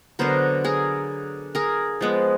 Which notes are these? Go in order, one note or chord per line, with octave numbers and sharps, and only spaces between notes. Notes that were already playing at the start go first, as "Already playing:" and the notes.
D3 F#3 B3 A#4 C5
G#4 A#4
G#4 A#4
F3 G#3 B3